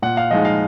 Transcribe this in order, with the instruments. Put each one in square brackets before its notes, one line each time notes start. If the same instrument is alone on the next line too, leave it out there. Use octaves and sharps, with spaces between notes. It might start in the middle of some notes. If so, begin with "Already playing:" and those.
[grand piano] A#2 F#5
F5
F3 G#3 D#4 D#5
F5